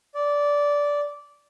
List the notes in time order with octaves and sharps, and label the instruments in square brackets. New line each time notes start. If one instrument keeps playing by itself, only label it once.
[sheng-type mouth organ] D5